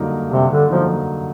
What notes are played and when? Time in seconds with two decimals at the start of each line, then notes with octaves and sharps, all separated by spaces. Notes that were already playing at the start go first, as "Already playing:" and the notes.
Already playing: G2 D3 F#3 A#3 D#4
0.31 G2 C3
0.51 D3
0.70 D3 F3 F#3 A#3 D#4